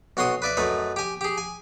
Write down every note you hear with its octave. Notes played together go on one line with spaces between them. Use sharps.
B1 F#4 C#5 C6 D#6
B4 D5 E5
F#2 A3 D#4 B4
G4 G#5
G4 G#4
G#5